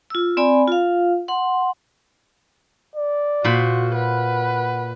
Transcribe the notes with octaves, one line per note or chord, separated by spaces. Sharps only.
F4 E6
C4 D5 G#5 B5
F4 F5
F#5 C6
D5
A#2 F#4 C5 B5
B4 F#5